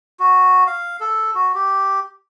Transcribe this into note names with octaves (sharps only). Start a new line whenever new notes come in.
F#4
F5
A4
F#4
G4